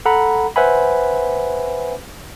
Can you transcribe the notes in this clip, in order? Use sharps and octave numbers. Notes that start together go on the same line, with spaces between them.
A4 F#5 A#5 B5
B4 C5 E5 F#5 G#5 B5